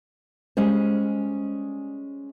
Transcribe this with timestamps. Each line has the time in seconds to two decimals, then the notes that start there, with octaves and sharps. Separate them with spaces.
0.57 G3 G#3 C#4 C5